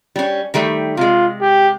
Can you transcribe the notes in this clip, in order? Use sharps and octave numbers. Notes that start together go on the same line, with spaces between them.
G3 C#4
D#3 G3 A3
C3 G#3 F4
G4